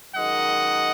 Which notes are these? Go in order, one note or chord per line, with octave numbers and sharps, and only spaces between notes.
F#2 D#3 G#3 D#5 F#5